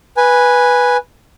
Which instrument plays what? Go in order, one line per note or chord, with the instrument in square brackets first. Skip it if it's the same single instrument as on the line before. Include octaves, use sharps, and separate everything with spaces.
[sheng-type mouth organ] B4 G#5